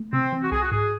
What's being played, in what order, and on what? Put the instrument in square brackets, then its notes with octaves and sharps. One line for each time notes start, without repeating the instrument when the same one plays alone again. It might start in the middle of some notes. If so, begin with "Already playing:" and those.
Already playing: [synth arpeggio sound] A3
[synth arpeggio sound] C3 [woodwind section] C4
[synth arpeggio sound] E3
[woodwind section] F#4
[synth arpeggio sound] C2 [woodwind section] G#4
[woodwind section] F#4
[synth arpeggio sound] G#2 [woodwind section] G#4